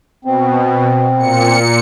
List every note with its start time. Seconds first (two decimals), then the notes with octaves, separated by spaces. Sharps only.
0.25 B2 C4
1.16 A#2 C#7